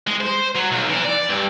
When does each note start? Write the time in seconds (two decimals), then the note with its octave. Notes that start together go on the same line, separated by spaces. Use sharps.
0.07 G#3
0.20 C5
0.55 F#3
0.71 B1
0.90 E3
1.04 D5
1.30 G2